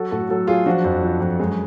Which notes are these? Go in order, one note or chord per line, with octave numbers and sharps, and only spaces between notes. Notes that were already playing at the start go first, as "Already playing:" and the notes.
Already playing: F#3 F#4 A4
A2 F#4 A4
F#3 F#4 A4
F#3 F4 G#4
F3 D4 F#4
F2
F3
F2
F#2 G#3